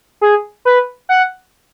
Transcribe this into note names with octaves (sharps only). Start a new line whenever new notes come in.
G#4
B4
F#5